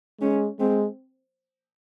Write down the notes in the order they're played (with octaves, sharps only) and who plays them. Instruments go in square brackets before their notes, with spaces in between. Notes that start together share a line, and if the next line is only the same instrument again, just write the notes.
[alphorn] G#3 [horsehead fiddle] C#4
[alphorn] G#3 [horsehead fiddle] C4